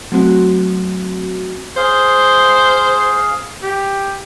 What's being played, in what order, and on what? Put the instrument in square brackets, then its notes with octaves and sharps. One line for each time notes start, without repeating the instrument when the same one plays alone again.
[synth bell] F#3 A3 C4 F#4
[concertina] G#4 F5 [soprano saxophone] C5
[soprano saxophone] G4